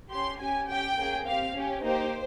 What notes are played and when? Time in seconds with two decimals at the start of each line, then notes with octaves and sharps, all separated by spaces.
0.11 C#4 G4 C6
0.40 C#4 G4 G#5
0.68 C#4 G4 G5
0.98 A#3 C#4 G#4
1.26 C4 G4 F5
1.55 C#4 G4
1.83 A#3 D#4 G4 C5